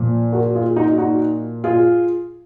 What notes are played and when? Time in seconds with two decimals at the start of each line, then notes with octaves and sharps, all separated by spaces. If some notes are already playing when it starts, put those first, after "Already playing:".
Already playing: A#2 F3
0.33 F#4 A#4
0.55 F4 G#4
0.76 D#4 F#4
0.98 D#4 F#4
1.64 F4 G#4